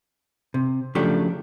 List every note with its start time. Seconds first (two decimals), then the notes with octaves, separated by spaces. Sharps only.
0.54 C3
0.95 C#3 F3 F#3 A3 D4 G4